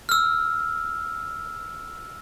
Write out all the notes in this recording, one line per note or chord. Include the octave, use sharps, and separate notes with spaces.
E6 F6